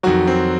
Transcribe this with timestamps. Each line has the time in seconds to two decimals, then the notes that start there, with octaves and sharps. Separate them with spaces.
0.03 F2 D#3 F#3 F#4
0.27 C4